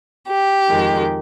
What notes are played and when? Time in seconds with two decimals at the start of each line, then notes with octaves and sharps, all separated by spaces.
0.27 G4
0.68 F2 D#3 G#3